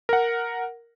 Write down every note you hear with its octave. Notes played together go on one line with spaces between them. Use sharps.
A#4 F#5